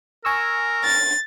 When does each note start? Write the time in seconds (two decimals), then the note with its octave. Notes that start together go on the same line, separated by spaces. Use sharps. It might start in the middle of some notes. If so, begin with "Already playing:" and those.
0.25 A#4 G#5 C#6 E6
0.84 A6